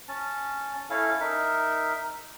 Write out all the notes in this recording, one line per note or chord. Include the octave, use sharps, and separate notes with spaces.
C#4 A5
C#4 E4 A4 F5
D#4 A#4 E5